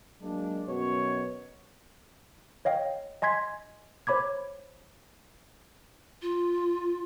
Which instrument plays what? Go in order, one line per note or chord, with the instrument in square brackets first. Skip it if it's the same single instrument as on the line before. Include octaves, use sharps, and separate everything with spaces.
[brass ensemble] F#3 G#3 A#3 D4
F#2 B2 C#5
[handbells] C#5 D#5 F5 G5
D#5 G#5 C6 G#6 B6
C5 C#5 B5 D6 G#6
[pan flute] F4